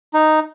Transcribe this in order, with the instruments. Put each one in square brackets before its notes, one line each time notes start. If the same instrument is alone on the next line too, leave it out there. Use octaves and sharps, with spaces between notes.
[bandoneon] D#4